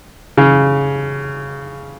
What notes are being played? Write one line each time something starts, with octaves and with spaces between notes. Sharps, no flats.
C#3